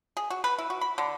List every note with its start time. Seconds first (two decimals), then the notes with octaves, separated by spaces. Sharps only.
0.17 G#4
0.30 F#4
0.44 B4
0.59 E4
0.70 F#4
0.81 B5
0.98 D3